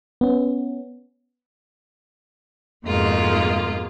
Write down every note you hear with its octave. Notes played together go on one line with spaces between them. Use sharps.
B3 C#4
F2 G#2 B2 G#3 A#3 F4